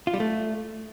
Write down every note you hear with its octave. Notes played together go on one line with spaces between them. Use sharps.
F4
G3
A3